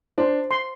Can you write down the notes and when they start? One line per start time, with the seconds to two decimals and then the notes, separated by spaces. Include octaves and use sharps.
0.18 D4 C5
0.51 C6